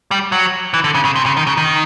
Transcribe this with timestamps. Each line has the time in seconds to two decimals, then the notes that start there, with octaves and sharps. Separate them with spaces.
0.11 G3
0.32 F#3
0.74 E3
0.84 D3
0.94 C#3
1.05 C#3
1.16 C3
1.26 C#3
1.37 D#3
1.47 C#3
1.57 D#3